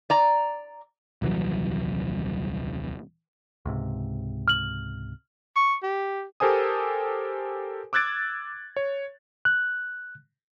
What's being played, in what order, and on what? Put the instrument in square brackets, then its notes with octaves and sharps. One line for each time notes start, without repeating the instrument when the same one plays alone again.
[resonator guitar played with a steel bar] D5 A#5
[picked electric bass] D#1 C2 E3 F#3
C#2 G#2 C3
[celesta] F6 F#7
[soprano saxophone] C#6
G4
[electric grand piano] G4 A4 A#4 C5 G#5 D#6
D6 E6 F#6 G#6 A6 D7
C#5
[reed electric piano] F#6